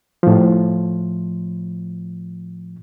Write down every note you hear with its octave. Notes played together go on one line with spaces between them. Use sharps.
A2 F3